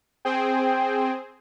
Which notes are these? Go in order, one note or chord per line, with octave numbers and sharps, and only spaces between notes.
C4 G#4 C5 G5